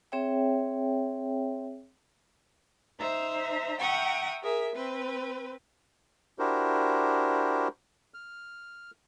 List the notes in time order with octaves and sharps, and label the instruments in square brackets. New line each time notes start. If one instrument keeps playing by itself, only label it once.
[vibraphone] C4 G#4 C#5 E5 G5
[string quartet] D#4 C5 E5 A#5
E5 F#5 G5 A#5 C#6 D#6
G#4 A#4 E5
C4 B4
[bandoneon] D4 E4 F#4 G4 A#4 C5
F6